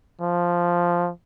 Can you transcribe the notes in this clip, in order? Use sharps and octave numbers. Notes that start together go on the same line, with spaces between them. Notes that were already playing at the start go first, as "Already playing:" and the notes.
F3